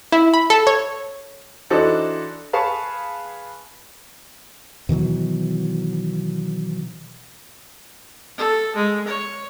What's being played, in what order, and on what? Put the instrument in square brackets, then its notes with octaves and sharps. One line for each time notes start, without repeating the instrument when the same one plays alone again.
[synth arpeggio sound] E4
B5
A4
C#5
[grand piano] E3 D4 D#4 F#4 A4 C5
G#4 B4 F5 A5 C#6
[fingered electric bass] B2 D#3 E3 F#3
[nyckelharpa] A4
G#3
C#5